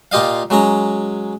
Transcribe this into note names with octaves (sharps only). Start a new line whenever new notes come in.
A#2 F4 G4 D#5 F5
F#3 G#3 C#4 A#5